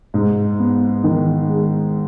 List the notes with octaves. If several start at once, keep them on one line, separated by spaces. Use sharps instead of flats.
G#2
B3
D#3
G#3